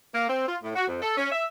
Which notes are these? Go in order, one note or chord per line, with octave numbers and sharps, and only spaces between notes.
A#3
C4
F4
A2
F#4
F2
A4
C#4
E5